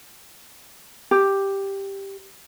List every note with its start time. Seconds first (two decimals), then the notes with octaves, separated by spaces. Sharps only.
1.11 G4